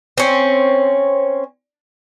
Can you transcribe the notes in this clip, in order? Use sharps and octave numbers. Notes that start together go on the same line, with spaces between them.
C4 C#4